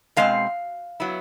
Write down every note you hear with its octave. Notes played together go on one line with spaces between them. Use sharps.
B2 G#3 C4 F5
F#3 B3 E4